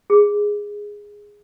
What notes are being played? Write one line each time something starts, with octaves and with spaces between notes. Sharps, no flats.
G#4